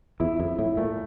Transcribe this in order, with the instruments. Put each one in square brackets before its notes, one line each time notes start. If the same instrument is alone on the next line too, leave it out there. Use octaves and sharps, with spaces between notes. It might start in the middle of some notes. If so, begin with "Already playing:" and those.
[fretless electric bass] E2 [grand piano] E4
[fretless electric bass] F2 [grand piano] E4
[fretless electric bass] A2 [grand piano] E4
[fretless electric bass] A#2 [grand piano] A3